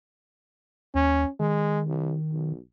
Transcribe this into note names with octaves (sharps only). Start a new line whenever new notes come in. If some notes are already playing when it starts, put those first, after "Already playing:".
D#2 C#4
D#3 G#3
C2
B1